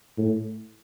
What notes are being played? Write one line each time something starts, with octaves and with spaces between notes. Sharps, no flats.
A2